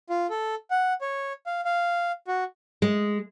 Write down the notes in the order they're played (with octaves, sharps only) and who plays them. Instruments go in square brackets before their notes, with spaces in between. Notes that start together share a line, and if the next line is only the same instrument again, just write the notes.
[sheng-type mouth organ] F4
A4
F#5
C#5
F5
F5
F#4
[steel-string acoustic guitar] G#3